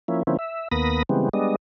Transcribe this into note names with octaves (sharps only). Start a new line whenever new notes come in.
F3 A#3 C#4 E4
D3 F3 A#3 C4 C#4 E4
E5
D#2 A#3 B3 B5 D#6 A#6
C#3 E3 G3 G#3 B3 C4
G3 G#3 B3 D4 D#5